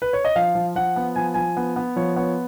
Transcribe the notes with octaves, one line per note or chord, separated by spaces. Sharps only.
B4
C#5
D#5
F3 F5
F3
F3 F#5
B3
F3 G#5
F3 G#5
B3
B3
F3 C#5
B3 C#5